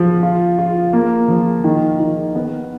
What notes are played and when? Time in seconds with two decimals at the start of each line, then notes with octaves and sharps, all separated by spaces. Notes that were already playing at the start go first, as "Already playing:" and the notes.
Already playing: F3
0.23 F4
0.58 F4
0.93 A#3
1.28 F3
1.64 D#3
1.99 D#3
2.35 B3